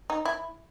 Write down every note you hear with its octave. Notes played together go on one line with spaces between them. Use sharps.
D#4
E4